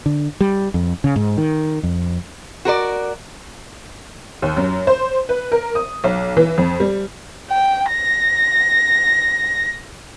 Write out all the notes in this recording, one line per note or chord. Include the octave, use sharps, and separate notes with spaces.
D3
G3
F2
C#3
G#2
D#3
F2
F#4 A#4 B4 D5
D#2
F#2
C5
B4
A#4
D#6
B1
E3
F2
G3
G5
A#6